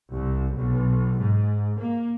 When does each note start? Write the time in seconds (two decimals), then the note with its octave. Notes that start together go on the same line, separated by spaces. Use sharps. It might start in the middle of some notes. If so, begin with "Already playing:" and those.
0.11 C2
0.53 B1
1.19 G#2
1.78 A#3